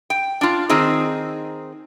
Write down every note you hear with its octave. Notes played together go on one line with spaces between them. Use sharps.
G5
D4 F4
D#3 C4 D#4 G#4